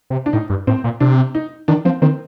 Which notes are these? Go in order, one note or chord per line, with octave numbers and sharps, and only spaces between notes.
C3
D4
A2 D#4
G2
A2 C4
A#2
C3 D4
D#4
D#3 D4
F3 C4
D#3 C4